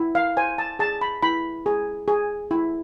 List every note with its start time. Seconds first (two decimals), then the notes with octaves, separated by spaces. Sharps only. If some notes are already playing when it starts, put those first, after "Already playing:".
Already playing: E4
0.15 F5
0.37 C5 G#5
0.58 A5
0.79 G#4 A5
1.01 B5
1.22 E4 B5
1.66 G#4
2.08 G#4
2.51 E4